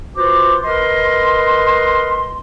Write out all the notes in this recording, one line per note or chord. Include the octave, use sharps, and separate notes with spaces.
F4 F#4 B4 C5 D6
A#4 B4 D#5 C6